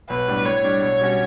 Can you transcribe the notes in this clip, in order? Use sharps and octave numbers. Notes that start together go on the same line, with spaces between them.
B1 B4
A2 G3 B3 D4
A2 C#5
G3 D4
B1 C#5
B2 G3 C#4 F#4